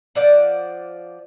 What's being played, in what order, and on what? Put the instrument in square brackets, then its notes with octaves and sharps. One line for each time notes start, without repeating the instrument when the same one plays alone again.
[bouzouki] F3 D5 F#5